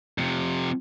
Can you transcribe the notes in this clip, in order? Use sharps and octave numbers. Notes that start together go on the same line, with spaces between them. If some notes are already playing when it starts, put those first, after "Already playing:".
F2 C3